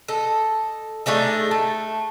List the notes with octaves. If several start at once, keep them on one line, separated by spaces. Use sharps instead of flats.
A4 D#5
A3 D4 D#4 G#4
A3